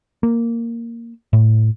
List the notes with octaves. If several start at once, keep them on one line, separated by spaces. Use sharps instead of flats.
A#3
A2